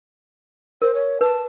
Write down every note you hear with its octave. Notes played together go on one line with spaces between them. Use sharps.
A#4 C5
C#5
B4 A5